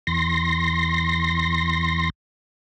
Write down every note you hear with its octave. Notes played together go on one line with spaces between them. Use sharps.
E2 C6 A#6